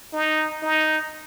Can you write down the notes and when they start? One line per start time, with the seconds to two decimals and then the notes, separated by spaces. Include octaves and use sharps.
0.13 D#4
0.63 D#4